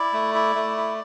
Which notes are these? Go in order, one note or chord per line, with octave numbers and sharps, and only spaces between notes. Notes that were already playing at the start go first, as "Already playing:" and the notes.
Already playing: E4 D5
A3
E4
A3
E4